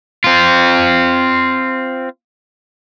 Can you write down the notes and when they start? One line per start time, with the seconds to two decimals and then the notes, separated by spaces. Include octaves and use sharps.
0.24 C4 F4